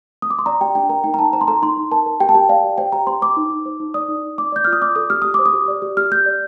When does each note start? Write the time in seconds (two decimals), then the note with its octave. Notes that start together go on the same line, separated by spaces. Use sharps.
0.22 D#6
0.30 D6
0.39 C6
0.46 D5 A#5
0.61 G4 G5
0.75 D4 G5
0.89 A#4 A#5
1.04 D#4 G5
1.14 A#5
1.19 D#4 A5
1.33 C5 A#5
1.41 C6
1.48 A4 A#5
1.62 D#4 C6
1.77 D#4
1.91 A#4 A5
2.06 A#4
2.20 G4 G5
2.29 A5
2.35 G4 G5
2.49 D5 F5
2.64 G4
2.78 C5 G5
2.92 G4 A#5
3.07 C5 C6
3.21 C5 D6
3.37 D#4
3.50 D#4
3.65 C5
3.80 D#4
3.94 D5 D#6
4.08 D#4
4.23 D#4
4.38 D5 D6
4.52 D5 G6
4.65 F4 F6
4.73 D#6
4.81 D5 D6
4.96 A4 D#6
5.10 G4 F6
5.22 G4 D#6
5.34 C5 D6
5.46 D#6
5.53 G4
5.68 D5
5.82 G4
5.97 G4 F6
6.11 G4 G6
6.26 D5